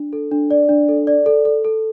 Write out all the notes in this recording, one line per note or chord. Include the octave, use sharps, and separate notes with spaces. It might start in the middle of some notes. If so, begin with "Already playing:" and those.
Already playing: D4
A4
D4
D5
D4
A4
D5
A4
A4
A4